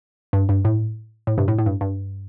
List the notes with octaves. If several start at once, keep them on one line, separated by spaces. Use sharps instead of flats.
G2
G2
A2
A2
G2 C3
A2
A2
G2
G2